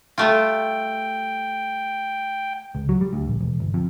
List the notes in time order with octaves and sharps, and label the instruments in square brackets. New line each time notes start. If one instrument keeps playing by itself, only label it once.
[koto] G3 A3 F4 [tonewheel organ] G5
[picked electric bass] C#2
F#3
G3
D2
A#1
E1
G1
F2